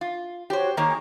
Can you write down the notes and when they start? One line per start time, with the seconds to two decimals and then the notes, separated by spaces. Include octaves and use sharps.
0.01 F4
0.50 F#4 G4 C5 C#5
0.77 D#3 A#3 G#4 C#5 A#5